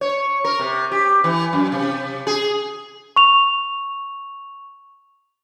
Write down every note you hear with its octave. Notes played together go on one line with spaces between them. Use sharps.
C#5
A#4
C3
G4
E3
F#2
C3
G#4
C#6 F7